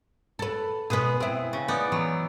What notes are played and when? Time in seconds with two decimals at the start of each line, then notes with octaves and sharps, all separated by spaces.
0.39 A4 B4
0.90 B2 G#3 B3 G#4 B4
1.20 C4 E4
1.53 C#3
1.68 B3 D#4 D5
1.92 E3 F#3